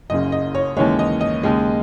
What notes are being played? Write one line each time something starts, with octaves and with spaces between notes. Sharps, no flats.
F#1 F#2 C#3 D#5
D#5
C#5
D#2 C#3 E3 G#3 C#5
D#5
D#5
D#2 C#3 G#3